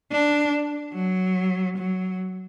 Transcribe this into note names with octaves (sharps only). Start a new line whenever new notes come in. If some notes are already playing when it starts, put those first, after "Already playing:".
D4
F#3
F#3